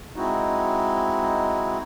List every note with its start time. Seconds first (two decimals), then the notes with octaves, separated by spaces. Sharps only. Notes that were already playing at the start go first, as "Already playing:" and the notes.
0.16 G#3 C4 D#4 E4 F#4